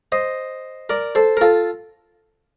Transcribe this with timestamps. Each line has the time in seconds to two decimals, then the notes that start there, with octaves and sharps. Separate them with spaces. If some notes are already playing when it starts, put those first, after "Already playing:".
0.12 C5 D#5
0.90 A#4 D5
1.15 A4 C5
1.37 A#4
1.41 F4 A4